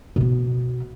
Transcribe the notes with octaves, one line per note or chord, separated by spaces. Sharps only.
B2 B3